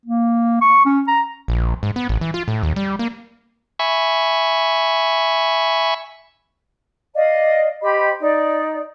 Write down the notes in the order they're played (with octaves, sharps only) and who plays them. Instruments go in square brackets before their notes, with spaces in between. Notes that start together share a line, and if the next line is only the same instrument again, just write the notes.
[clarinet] A#3
C#6
C#4
A#5
[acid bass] A#1
G#2
B3
A1
E3
F4
A2
D#2
G3
A#3
[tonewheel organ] E5 G#5 B5 C#6
[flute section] D5 D#5 F5
G4 C5 D#5 B5
D#4 D5